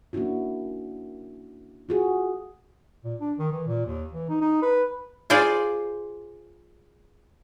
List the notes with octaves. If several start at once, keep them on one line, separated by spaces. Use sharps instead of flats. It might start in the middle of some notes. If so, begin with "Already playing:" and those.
A#3 C#4 D4 E4 F#4
F4 F#4 G#4
A#2
D4
D#3
E3
A#2
D#2
E3
D#4
D#4
B4
F4 G#4 C5 D5